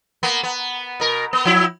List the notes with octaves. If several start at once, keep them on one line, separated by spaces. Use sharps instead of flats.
A#3 B3
B3
B2 A#4
B3
F3 E4